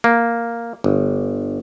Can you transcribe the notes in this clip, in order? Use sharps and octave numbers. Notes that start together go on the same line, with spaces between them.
A#3
G1